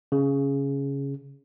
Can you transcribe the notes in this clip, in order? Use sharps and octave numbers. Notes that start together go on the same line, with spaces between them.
C#3